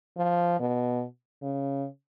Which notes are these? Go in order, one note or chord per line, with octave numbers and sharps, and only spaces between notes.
F3
B2
C#3